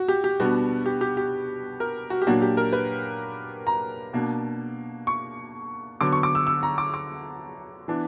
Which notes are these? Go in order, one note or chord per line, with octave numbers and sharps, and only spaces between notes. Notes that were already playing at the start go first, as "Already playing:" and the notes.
Already playing: F#4
G4
G4
B2 G3 B3 D4 F#4
G4
G4
G4
A#4
F#4
G4
A#2 F#3 A#3 D4 F#4
G4
A#4
B4
A#5
B2 A#3 D4
C#6
D3 F#3 B3 D6
C#6
D6
E6
E6
A#5
D6
D6
E3 B3 D4